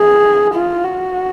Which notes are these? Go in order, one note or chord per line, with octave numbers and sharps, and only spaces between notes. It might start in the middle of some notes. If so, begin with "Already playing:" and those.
Already playing: G#4
F4
F#4